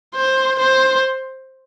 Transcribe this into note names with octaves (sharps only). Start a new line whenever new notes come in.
C5
C5